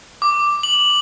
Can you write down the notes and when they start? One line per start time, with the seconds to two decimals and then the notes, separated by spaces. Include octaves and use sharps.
0.22 D6
0.63 F#7